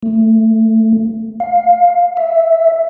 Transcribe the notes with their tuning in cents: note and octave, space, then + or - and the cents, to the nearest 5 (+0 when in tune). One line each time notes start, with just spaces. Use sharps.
A3 +15
F5 +15
E5 +0